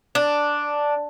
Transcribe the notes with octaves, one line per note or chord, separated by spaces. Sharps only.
D4